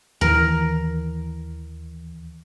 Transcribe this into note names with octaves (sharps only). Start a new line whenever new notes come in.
D#2 E3 A#4